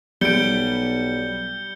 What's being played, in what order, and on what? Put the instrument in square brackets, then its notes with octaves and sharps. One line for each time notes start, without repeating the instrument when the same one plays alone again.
[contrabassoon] B1 [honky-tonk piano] G3 D7 [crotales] G6 C#7 G7